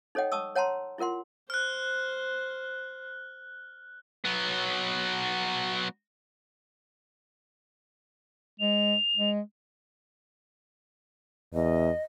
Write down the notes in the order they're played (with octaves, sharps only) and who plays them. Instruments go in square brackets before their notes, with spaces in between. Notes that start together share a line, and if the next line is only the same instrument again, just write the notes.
[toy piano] D#4 A4 C#5 D#5 F#5 G5
A5 C#6 D#6 E6
C#5 F#5 A5 A#5 C6
E4 F4 A#4 F#5 C6
[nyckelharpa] C5 [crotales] F6 F#6
[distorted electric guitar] F#3 B3
[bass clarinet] G#3 [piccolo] F7
[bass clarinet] G#3
[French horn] E2 [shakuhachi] D#5